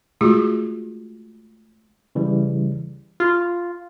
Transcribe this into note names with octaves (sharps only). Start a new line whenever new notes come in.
G#3 A3 F4 F#4 G#4
C#3 E3 G3
F4